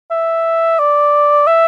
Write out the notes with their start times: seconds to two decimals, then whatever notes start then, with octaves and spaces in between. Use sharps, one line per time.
0.11 E5
0.79 D5
1.47 E5